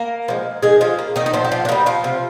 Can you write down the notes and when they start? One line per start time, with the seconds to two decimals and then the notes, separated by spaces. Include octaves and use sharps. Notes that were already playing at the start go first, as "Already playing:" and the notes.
Already playing: A#3 A#4
0.28 F3 G#3
0.63 D#3 G#3 G#4
0.81 F3 F4
0.99 A#3
1.16 D#3 D#4
1.26 D#4
1.33 A#2 F3 F4
1.45 G4
1.52 F3 F4
1.65 D4
1.69 D#3 G3 A#3 D#4
1.86 F3 F4
2.04 C3